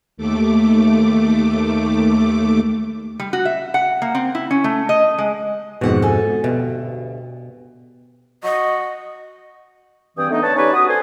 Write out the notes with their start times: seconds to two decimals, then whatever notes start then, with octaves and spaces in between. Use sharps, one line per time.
0.17 D#2 A3 D6
3.20 G3
3.33 F#4
3.45 E5
3.74 F#5
4.02 A#3
4.15 C4
4.35 E4
4.51 C#4
4.64 A3
4.89 D#5
5.18 G#3
5.81 F2 G#2 B2 F#4 F#5
6.02 A4 G#5
6.44 D2 G2 B2
8.44 F#4 D#5
10.17 G2 E3 C4 G#4 G5 D#6
10.31 A3 B3 D4 D#4
10.42 D3 B4 C#5 A5
10.56 C#4 D#4 G4 B4 C#5 D5
10.73 F#4 D#6
10.89 A4 B4 C5 G#5